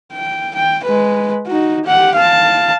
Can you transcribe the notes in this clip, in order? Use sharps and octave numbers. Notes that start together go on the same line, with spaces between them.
G5
G5
G#3 B4
D#4 F#4
G4 F#5
F5 A5